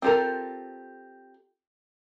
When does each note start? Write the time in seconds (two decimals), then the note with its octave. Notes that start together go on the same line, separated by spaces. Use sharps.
0.02 C4 F4 G4 A4 A#4